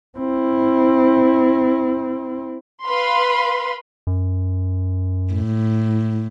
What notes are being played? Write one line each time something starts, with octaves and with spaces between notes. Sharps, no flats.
C4 E4
B4 F5 B5 C6
F#2
A2